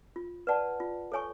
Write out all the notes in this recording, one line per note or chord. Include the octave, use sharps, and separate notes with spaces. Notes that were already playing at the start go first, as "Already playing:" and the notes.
F4
B4 D5 F#5 A5
F4
A4 C#5 G#5 C#6